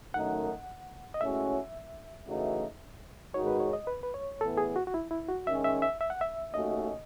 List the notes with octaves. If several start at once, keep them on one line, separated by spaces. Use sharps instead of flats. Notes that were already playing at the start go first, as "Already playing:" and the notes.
F#2 D#3 A3 D#4 F#5
D#5
A2 G#3 C#4 F#4 E5
C#3 E3 A3 D#4 F#4
G#2 D#3 G#3 D#4 F#4 C#5
B4
C#5
D#5
B4
B4
C#5
A2 E3 B3 A4
G#4
F#4
F#4
E4
E4
F#4
D#3 G#3 C#4 E5
E5
E5
E5
F#5
E5
D#2 D#3 A3 C#4 F#4 D#5